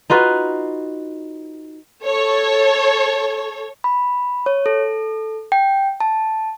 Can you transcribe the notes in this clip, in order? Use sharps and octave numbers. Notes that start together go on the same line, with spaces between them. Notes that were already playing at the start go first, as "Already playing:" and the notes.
D#4 F4 F#4 B4
A4 C#5
B5
C#5
A4
G5
A5